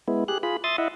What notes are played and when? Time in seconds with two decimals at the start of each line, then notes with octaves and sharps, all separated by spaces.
0.08 G#3 B3 E4
0.28 G4 G#4 F#6
0.43 F4 G#4 B5
0.64 E5 C6 D#6 A6
0.78 E4 D#5 E5 F#5